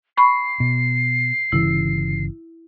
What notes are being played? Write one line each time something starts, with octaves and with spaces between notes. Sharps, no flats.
B5 C#6 C7
B2
G1 C#3 E3 E4